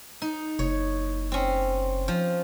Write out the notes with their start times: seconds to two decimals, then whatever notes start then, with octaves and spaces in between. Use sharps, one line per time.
0.22 D#4
0.59 F#1 C#5
1.32 C4 C#4
2.08 F3